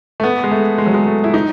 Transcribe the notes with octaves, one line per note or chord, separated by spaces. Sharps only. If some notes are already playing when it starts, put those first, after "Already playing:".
A3
B3
G#3
A3
G#3
F#3
G#3
A3
E4
D#4